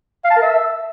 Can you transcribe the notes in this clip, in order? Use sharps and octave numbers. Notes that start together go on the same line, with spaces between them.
F5
A5
A#4
E5